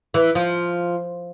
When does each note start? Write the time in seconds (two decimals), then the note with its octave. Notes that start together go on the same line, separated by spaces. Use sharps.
0.14 E3
0.35 F3